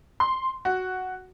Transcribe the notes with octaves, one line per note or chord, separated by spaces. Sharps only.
C6
F#4